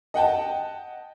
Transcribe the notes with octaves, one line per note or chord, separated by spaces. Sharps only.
D#5 F#5 G5 A5